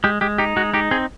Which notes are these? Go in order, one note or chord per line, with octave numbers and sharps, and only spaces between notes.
G#3 G4
G#3 G4
D#4 G4
G#3 F#4
D#4 G4
C4 G#4